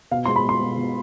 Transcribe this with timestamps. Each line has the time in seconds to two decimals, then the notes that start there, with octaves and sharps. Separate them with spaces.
0.11 B2 F5
0.25 G#3 C6
0.36 B5
0.45 G#3 C6
0.61 B2
0.78 B2